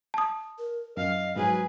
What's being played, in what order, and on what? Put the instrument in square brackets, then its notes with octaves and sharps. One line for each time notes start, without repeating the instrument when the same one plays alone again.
[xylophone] A5 D#6
[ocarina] A#4
[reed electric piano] F#2 [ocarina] D#5 [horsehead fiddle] F5
[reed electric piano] G#2 F#3 [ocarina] F#4 [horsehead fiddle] G#4 B4